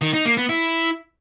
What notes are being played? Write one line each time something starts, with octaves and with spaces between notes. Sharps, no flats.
D#3
D#4
A#3
B3
E4